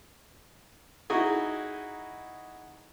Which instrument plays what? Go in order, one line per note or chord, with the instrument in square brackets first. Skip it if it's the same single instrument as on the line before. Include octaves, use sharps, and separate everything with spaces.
[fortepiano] D#4 E4 F#4 G#4